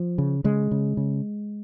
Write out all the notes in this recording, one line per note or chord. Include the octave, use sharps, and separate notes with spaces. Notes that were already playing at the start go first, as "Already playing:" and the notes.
Already playing: F3
C#3
C#3 G#3
C#3
C#3